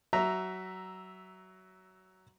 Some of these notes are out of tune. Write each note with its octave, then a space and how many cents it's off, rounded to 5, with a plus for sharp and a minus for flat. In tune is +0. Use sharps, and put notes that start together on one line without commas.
F#3 +15 E5 +0 A#5 +0